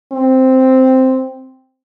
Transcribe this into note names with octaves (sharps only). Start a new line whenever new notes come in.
C4